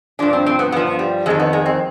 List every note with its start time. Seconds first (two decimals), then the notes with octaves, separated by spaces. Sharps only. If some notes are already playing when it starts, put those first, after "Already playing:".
0.19 G2 F3 D4
0.33 C4
0.46 C4
0.59 B3
0.72 G2 F3 B3
0.99 G3
1.26 F2 D#3 G#3
1.39 B3
1.53 G#3
1.66 C4